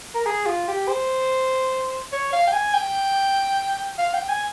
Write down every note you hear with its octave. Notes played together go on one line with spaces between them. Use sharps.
A#4
G#4
F4
G4
C5
C#5
F5
G5
G#5
G5
F5
G5
G#5